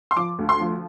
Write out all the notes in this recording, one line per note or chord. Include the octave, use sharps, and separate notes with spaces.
C6
F3 D6
D2
C6
F3